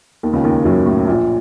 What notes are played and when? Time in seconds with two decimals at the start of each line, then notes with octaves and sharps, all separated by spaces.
0.23 D#2 D#3
0.33 C#2 C#3
0.44 D#2 D#3
0.65 F#2 F#3
0.86 A2
1.07 A#1 A#2